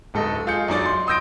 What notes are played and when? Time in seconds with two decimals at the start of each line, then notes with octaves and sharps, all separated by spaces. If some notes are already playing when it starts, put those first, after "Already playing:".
0.14 D1 G#2 A4 D#5
0.47 F4 G#4 G6 C#7
0.68 F#2 D#4 D5 A6
0.86 C6
1.07 C6 D#6 E6 G6 A#6 D7